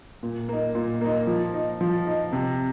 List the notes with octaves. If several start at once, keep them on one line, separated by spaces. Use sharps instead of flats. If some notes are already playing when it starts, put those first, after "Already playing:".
A#2
A#3 D#4
A#2
A#3 D#4
F3
D#4
F3
D#4
C3